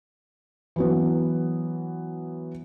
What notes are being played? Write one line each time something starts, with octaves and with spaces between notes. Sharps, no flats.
E3 F#3 B3